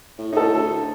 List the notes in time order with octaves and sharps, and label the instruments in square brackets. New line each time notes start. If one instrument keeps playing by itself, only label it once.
[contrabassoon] A2
[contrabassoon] A2 [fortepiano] D#4 A4
[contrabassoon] D2